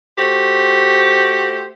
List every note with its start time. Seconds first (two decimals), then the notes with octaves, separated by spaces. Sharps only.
0.18 A3 F#4 G4 C5